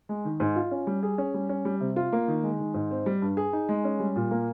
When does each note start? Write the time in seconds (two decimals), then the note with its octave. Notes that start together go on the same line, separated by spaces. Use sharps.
0.09 G#3
0.25 D#3
0.40 G#2
0.56 F4
0.71 C#4
0.87 G3
1.03 G#4
1.18 C#4
1.34 G3
1.49 C#4
1.65 G3
1.81 C3
1.96 F4
2.13 A#3
2.28 D#3
2.43 G#3
2.59 D#3
2.74 G#2
2.91 C4
3.06 G3
3.22 G2
3.37 G#4
3.53 D#4
3.69 G#3
3.84 C#4
4.00 G3
4.16 A#2
4.31 A#3